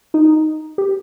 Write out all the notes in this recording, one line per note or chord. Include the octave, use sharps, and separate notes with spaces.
D#4
G4